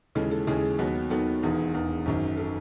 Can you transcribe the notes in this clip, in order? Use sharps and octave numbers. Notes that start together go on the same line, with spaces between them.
D#2 C#3 E3 G#3 A4
A4
D#2 C#3 E3 G#3 G#4
D#2 D#3 F#3 B3
D#2 D#3 F#3 B3 A4
E1 E2 D#3
E1 E2 D#3
G#1 F#2 D#3
A4
D#3